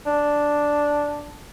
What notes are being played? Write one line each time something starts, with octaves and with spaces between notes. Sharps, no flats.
D4